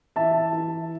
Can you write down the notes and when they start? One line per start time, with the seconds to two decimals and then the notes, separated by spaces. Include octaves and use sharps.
0.16 E3 E5 A5
0.53 E3